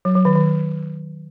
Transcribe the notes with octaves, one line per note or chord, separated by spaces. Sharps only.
F#3
F#3
D#3
D#3